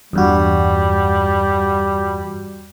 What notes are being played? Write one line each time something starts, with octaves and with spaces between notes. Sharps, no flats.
E2 G2 G3 F#4